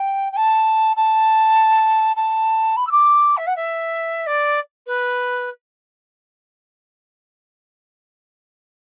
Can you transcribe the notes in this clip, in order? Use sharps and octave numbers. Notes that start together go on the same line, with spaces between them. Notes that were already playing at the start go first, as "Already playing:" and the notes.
Already playing: G5
G5
A5
A5
A5
B5
E6
D6
E5
F#5
E5
D5
B4